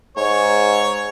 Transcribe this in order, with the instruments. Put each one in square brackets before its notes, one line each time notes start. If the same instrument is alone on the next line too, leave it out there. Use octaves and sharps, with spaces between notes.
[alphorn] G#2 [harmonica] C#5